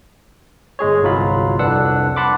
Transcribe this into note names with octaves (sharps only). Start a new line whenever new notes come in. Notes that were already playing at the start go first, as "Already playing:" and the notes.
G1 G#3 G#4 C#5
G1 C2 F#3 F4 B5
C2 F2 D4 B4 F#5 E6
F#5 A5 B5 C6 D6